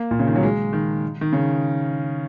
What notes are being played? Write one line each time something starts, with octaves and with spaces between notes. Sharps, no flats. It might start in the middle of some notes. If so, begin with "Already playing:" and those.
Already playing: A#3
A#2
C#3
D#3
F#3
G#3
D#3
D#3
C#3